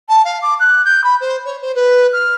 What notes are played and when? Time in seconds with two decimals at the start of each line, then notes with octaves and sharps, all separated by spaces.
0.09 A5
0.24 F5
0.42 D6
0.60 F#6
0.85 G6
1.04 B5
1.21 C5
1.45 C#5
1.62 C5
1.75 B4
2.13 F6